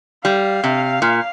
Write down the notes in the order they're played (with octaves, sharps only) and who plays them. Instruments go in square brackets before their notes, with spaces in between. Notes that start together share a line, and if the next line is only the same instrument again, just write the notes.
[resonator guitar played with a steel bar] G3 [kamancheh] F5
[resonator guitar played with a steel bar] C3
A#2